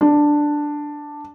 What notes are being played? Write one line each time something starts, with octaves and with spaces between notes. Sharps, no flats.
D4